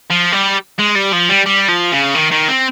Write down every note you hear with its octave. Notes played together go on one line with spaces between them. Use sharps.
F3
G3
G#3
G3
F3
G3
G3
F3
C#3
D#3
D#3
C4